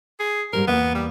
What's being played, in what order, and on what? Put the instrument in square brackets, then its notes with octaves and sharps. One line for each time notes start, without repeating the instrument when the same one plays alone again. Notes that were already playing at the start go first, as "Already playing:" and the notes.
[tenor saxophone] G#4
[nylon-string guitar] G#2 G3 C5 [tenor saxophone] A#4
[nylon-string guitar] E2 A#3 F5 [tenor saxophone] B3
[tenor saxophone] G3